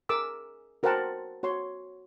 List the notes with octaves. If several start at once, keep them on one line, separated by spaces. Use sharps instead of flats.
G#4 A#4 D6 E6
F#4 A#4 C5 F#5 G5 A5
F#4 C#5 C6